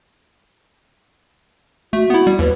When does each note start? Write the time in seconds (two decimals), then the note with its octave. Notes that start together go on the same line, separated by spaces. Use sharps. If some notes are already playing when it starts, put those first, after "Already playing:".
1.93 A3 F#4
2.10 B3 E4
2.27 G3
2.39 D#2 B4